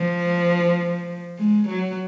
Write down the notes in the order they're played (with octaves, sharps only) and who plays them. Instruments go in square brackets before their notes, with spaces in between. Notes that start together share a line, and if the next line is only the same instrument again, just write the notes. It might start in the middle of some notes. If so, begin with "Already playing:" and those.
Already playing: [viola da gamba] F3
G#3
F#3